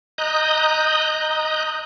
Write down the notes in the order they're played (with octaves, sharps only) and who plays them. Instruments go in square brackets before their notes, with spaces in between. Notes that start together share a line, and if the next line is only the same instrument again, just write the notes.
[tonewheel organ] D#5 A#5 D#6 F#6 G6